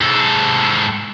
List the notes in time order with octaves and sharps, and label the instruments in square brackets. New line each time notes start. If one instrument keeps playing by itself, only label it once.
[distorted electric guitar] G#2 A4